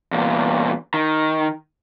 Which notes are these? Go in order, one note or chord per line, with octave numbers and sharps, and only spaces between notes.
E2 A#2
D#3